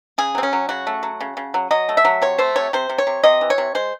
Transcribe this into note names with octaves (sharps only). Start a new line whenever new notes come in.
C#3 G#4
F#3 C4
C#4
F#3
C#3 F#4
A3
F#3
C#3
C#3
F#3
F#3 D#5
A3
E5
F#3
C3 C#5
A3 C5
C3 C#5
C3 C5
C3
C#5
C3
C3 D#5
E3
C#5
C3
G#3 C5